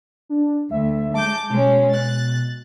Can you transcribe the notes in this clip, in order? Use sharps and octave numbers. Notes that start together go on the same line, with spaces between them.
D4
D2 E5
G#3 A5 D6 G6
B2 G#3 C#4
F#6 A6